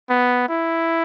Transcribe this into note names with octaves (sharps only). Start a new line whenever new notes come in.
B3
E4